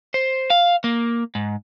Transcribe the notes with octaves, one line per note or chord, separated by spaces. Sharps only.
C5
F5
A#3
G#2